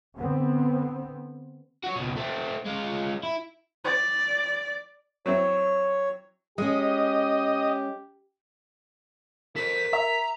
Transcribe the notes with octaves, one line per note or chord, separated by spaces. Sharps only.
D3 B3 C4
F#4 C#5
C#2 B2
A3 C4
G#3 F4
E4
D5
F#3 C4 E4 C#5
G#3 C#4 G4 D#5
A4 A#4 C5 B6
E5 A#5